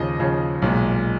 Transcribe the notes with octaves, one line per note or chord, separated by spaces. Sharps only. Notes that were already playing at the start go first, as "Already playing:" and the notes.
Already playing: D#2 C#3 F3 D#5
D#2 C#3 F3
B1 A#2 G#3